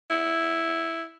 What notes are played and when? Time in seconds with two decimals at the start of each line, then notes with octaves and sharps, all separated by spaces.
0.10 E4